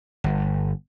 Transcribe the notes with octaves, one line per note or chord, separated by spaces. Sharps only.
G1